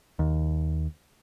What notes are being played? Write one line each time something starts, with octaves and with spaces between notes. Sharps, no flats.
D#2